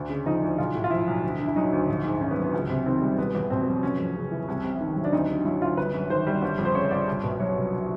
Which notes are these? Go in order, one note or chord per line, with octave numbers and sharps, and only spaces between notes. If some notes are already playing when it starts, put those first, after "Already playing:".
Already playing: D2 D4
C#3
F3 D#4
D2
B1 F4
A2
F4
F3 E4
B1
D2
D3
E4
F#3 D#4
D2
A#1
G#2
D#3 C#4
B3
F#3
B3
C#2
C3
D#3 C4
G3
E1 B3
E2
B2 C4
F#3
F1 C#4
F2
C#3
E3
C2
C3
D#3
F#3
D4
D2 D#4
D3
F#3 E4
D2 F4
G1 B4
F#2
D#3 C5
G3
G1
F2
C5
C#3 C#5
G1 D5
C2
B2
F#3 C#5
C2